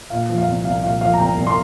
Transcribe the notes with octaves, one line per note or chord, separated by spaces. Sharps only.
A#2 F5
F3
F5
C2
C2 F5
A#2 F5
F3 F5
A#5
C2 G5
C2
C6